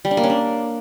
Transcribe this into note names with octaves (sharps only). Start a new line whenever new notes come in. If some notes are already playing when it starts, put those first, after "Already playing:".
G3
D4
A#3
C#4
D4